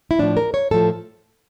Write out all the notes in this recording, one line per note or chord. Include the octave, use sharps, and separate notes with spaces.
E4
A2 F3 D4
A#4
C#5
A2 F3 A4